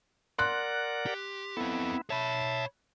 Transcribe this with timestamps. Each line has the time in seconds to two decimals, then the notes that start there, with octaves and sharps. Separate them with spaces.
0.39 A#4 D5 F#5 C6 F#6
1.06 G4
1.57 B3 C4 E4 A4
2.10 C#5 E5 A5 B5